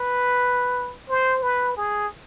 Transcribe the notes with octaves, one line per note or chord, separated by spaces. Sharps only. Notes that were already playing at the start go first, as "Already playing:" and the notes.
Already playing: B4
C5
B4
G#4